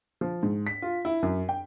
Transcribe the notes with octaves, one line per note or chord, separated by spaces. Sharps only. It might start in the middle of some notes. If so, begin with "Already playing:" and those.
F3
G#2
B6
F4
E4
F#2
G5